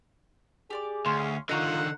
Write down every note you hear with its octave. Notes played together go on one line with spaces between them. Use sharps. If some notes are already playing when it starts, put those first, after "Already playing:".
G4 G#4 D5 D6
D2 C#4 F5 C6
D3 D#3 F4 C5 D#5 F#5 A#5 C#6